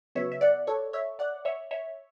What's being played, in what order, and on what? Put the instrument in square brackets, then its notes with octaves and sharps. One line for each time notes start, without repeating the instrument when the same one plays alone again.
[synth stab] C#3 F#3 B3 C#5 E5
E5
D5 F#5
A4 C#5
C#5 E5
D5 F#5
C#5 E5
C#5 E5